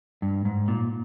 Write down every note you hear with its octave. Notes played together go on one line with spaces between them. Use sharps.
G2
G#2
A#2